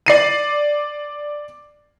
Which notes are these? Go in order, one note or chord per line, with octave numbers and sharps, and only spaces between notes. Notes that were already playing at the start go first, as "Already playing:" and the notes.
D5 C7 D#7